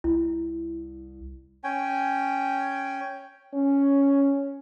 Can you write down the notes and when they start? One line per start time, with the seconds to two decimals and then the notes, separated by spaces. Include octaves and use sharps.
0.04 C2 E4
1.64 C#4 G5 G#5
3.54 C#4